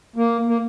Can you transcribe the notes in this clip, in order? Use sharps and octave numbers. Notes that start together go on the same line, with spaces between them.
A#3
A#3